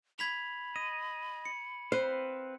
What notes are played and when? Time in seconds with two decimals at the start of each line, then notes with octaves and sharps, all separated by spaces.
0.19 B5 G#6 B6 F7
0.76 D#5 D#7
1.45 C#7
1.92 C4 B4 C5 F5